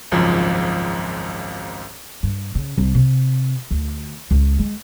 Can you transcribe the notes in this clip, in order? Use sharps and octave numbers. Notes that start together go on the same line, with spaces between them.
G#1 C#2 F#2 F3
G2
C#3
C2
C3
D2
C#2
G#3